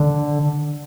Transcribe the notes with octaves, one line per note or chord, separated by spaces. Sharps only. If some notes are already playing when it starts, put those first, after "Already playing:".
Already playing: D3